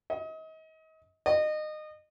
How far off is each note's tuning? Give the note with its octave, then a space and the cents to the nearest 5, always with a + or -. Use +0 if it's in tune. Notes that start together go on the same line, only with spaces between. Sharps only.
D#5 +35
D#5 -25